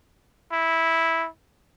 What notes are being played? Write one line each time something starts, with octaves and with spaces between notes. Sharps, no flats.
E4